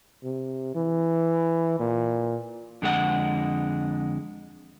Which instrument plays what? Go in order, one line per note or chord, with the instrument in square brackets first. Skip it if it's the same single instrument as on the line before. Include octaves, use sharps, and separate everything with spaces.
[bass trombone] C3
E3
A#2
[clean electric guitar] F2 D3 G#3 F#5